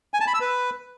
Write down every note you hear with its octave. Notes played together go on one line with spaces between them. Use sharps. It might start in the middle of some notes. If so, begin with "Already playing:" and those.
G#5
A5
B5
E6
B4